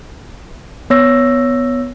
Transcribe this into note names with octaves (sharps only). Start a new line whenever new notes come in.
B3 C#5 E6 A#6